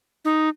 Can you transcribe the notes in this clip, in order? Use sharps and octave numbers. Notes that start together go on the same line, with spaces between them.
D#4